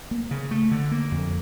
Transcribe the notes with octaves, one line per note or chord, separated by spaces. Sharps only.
A#3
C#3
A3
D3
A#3
F2